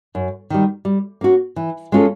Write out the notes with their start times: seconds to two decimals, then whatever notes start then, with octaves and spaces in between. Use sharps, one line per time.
0.15 F#2
0.50 D#3 G3
0.85 G3
1.21 A#3 C#4 F#4
1.56 E3
1.92 G#3 C#4 F4 A4